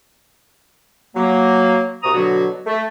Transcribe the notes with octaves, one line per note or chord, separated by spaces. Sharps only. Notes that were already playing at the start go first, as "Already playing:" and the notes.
F#3 A#3
C2 C3 F#4 A#5 D#6
B2 D3 F#3 F#4
A3